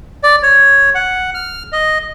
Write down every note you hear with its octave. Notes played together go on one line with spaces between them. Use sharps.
D5
C#5
F#5
F6
D#5